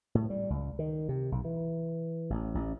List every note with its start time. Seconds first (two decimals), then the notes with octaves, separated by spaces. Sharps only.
0.15 A2
0.30 G3
0.50 C#2
0.79 D#3
1.09 C3
1.32 B1
1.45 E3
2.30 A1
2.55 A1